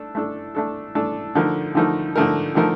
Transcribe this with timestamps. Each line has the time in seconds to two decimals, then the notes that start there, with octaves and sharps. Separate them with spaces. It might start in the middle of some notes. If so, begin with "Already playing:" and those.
Already playing: A3 D4 A4
0.15 A3 D4 A4
0.55 A3 D4 A4
0.95 A3 D4 A4
1.35 D3 F3 A3 D#4 A#4
1.75 D3 F3 A3 D#4 A#4
2.16 D3 F3 A3 D#4 A#4
2.55 D3 F3 A3 D#4 A#4